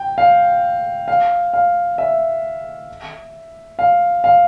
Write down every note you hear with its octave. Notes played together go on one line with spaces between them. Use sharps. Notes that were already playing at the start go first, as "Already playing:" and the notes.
Already playing: G5
F5
F5
F5
E5
F5
F5